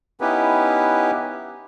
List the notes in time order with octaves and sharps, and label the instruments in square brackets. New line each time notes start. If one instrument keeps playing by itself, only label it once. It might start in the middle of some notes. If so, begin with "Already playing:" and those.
[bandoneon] B3 C#4 D#4 E4 G4 B4